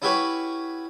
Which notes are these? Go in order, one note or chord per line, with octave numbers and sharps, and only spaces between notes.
C#4 E4 F#4 G4 B4 C#5